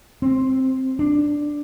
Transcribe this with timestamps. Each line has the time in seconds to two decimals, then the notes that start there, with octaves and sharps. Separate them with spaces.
0.22 C4
0.99 D4